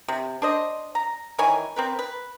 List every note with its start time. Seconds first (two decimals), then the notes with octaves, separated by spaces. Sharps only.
0.08 C3
0.42 D4 C5 D#5
0.95 A#5
1.38 D#3 E3 C#5 G#5
1.76 C4 A#4 B4
1.99 B4